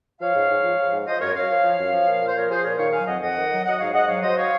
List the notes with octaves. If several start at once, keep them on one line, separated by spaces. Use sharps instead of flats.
F3 C#5 F5
G#2
G#2
F3
F3
G#2
F3 C5 D#5
F#2 A#4 C#5
F#2 C#5 F5
F3
F3
F#2
F3
A#2
A#2
C5
F3 A#4 C#5
F3 G#4 C5
A#2 A#4 C#5
D#3 C#5 F5
F#3 F5 G#5
F2 D#5 F#5
F2 D#5 F#5
D#3
F#3
F#3 D#5 F#5
G#2 C#5 F5
G#2 D#5 F#5
F#3 C#5 F5
F#3 C5 D#5
C#5 F5